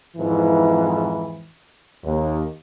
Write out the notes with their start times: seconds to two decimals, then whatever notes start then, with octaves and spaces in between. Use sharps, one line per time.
0.16 F2 G#2 E3
2.04 D#2